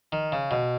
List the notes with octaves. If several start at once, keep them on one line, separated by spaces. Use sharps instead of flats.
D#3
C#3
B2